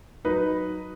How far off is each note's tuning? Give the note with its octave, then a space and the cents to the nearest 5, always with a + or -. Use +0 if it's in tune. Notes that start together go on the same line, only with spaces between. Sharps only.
F#3 +0 D#4 +0 B4 +0